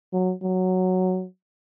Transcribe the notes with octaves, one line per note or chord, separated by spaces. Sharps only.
F#3
F#3